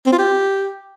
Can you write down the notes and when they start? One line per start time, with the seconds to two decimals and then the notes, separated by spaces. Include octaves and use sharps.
0.06 C4
0.12 F4
0.18 G4